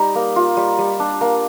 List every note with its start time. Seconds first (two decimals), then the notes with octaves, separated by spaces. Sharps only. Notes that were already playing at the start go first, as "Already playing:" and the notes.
Already playing: G3 D#4 A#5
0.15 A#3
0.36 F4
0.57 G3
0.79 G3
1.00 D4
1.21 A#3